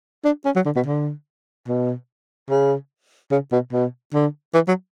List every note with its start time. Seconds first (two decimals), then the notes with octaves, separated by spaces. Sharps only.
0.25 D4
0.45 C#4
0.56 F#3
0.65 D3
0.76 B2
0.86 D3
1.68 B2
2.49 C#3
3.31 C#3
3.52 B2
3.73 B2
4.14 D3
4.54 E3
4.68 F#3